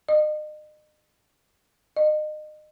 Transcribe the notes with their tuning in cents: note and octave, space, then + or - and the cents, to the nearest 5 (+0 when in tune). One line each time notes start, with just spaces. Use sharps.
D#5 -40
D#5 -30